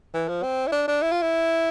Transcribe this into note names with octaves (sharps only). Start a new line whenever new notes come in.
E3
F3
C4
E4
D4
D4
E4
F4
E4